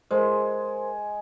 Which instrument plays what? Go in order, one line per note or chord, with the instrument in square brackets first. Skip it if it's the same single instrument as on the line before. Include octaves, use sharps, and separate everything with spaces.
[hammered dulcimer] G#3 [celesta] A#4 C5